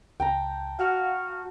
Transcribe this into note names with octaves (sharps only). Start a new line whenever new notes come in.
C#2 G5 A5 A#5
F#4 F5 F#5 F6